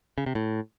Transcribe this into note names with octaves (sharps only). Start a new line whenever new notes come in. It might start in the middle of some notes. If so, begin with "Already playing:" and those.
C#3
C3
A2